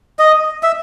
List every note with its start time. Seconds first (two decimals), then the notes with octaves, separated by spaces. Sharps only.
0.19 D#5
0.63 E5